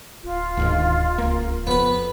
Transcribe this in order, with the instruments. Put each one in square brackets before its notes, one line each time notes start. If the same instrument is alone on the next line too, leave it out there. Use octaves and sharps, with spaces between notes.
[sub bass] D1 [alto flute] F4
[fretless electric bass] D2 G#2 D#3
C#2 A#3
[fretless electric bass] F2 [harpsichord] B3 B4